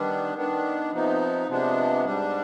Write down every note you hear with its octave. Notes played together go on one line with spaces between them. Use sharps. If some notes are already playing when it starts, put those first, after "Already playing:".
Already playing: D#3 G3 B3 D4
D#3 B3 D4
C3 F3 B3 D#4
C3 F3 G#3 B3 D4
G#2 G3 D4